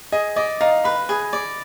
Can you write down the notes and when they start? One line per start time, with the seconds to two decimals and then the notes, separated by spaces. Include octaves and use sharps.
0.12 G#4 D#5
0.36 D5 D#5
0.61 D#4 F5
0.84 B4 B5
1.09 G#4
1.33 D5